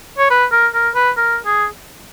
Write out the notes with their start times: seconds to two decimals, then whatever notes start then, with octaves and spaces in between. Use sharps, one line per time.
0.18 C#5
0.30 B4
0.52 A#4
0.74 A#4
0.95 B4
1.17 A#4
1.46 G#4